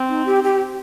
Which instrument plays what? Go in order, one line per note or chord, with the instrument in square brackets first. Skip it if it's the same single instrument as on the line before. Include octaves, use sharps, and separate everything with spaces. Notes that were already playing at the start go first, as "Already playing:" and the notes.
Already playing: [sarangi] C4
[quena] D#4
G4
G4